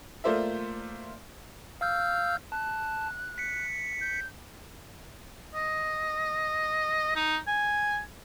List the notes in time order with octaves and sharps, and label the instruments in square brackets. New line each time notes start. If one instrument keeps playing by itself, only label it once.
[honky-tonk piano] A3 A#3 F4 C5 D5 E5
[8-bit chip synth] F5 E6 G6 [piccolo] F6
[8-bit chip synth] A5 [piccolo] F#6
[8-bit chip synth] B6 C#7
[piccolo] G6
[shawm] D#5
D#4
G#5